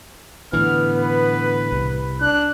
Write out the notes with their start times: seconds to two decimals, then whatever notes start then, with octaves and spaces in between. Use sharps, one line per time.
0.53 A2 D3 E3 B3 F6
0.92 B4
1.72 C2
2.21 D4 F#6